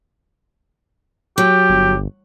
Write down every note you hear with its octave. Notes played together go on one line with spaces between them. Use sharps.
F#3 G4
G1